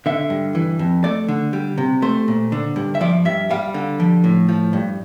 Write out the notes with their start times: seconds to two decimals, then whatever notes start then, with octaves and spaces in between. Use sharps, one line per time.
0.06 D3 E5
0.30 G2
0.55 E3
0.79 F2
1.04 A3 D5
1.28 D3
1.53 G3
1.78 C3
2.02 A3 C5
2.28 A#2
2.52 D3
2.76 G2
2.95 E5
3.01 F3 D5
3.25 G2 E5
3.51 G3 F5
3.74 D3
4.00 F3
4.24 A2
4.48 F3
4.73 G2